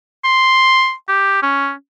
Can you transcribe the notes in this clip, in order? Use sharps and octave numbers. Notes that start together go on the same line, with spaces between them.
C6
G4
C#4